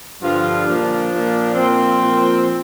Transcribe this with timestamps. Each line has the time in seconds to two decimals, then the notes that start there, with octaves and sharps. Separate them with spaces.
0.22 G2 D3 F3 F4
0.66 A#2 F3 D4
1.11 A#2 F3
1.55 A#2 F3 C4
2.00 A#2 F3